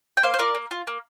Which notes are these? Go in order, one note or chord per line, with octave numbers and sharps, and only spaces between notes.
G5
A#3 C5 F5
C5
F4 A#4 D5
A#3
F4
A#3